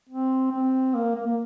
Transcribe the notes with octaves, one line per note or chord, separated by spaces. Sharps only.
C4
C4
A#3
A#3
A#3